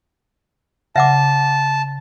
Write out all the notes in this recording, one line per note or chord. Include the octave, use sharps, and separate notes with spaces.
C#3 E5 F#5 A5 D6